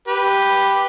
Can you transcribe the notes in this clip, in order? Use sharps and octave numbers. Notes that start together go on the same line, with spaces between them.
G4 B4